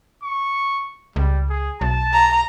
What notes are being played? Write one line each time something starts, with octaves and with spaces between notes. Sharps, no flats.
C#6
C#2 G3
G#4
B1 A5
A#5